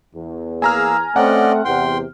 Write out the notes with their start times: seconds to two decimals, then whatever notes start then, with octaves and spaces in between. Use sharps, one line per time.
0.14 E2
0.62 A#3 G#4 G#5 A#5 E6 F6
1.16 A3 C4 C#4 D5 D#5 F#5
1.65 E2 C3 G5 C6